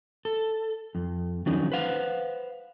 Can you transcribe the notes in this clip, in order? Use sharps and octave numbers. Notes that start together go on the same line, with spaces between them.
A4
F2
D#3 F3 F#3 C#4 D#4
B4 C5 F5 F#5